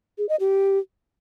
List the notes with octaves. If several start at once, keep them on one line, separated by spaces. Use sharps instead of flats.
G#4
D#5
G4